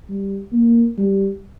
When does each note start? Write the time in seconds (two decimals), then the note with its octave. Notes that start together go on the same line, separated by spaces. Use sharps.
0.09 G3
0.52 A#3
0.98 G3